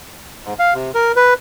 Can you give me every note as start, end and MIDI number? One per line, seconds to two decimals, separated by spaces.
0.45 0.54 44
0.59 0.74 77
0.74 0.91 48
0.95 1.12 70
1.16 1.34 71